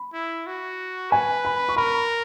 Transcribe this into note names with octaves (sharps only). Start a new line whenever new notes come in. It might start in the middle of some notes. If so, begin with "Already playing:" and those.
Already playing: B5
E4
F#4
B4 G#5
B5
C#6
A#4 B5